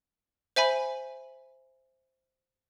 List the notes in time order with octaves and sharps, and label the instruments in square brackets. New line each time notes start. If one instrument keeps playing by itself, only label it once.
[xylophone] C5 E5 G#5 B5